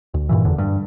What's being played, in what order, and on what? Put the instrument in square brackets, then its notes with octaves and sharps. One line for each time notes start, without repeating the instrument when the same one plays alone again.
[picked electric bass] D2
G2 A#2 E3
F#1 E2 D3
G2